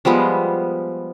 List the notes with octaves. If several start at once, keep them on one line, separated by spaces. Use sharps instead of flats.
F3 G3 G#3 B3